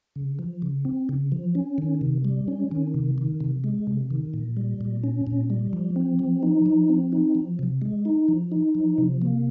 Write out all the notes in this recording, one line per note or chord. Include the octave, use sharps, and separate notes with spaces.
C#3
F3
C#3
C4
C#3
F3
C#4
D#3
C3
G3
C#4
D#3
C3
D#3
C3
G#3
C3
D#3
A#2
G3
A#2
C#4
A#2
G3
F3
C4
F3
D#4
F3
C4
D#4
F3
C3
G#3
D#4
F3
D#4
F3
C3
A#3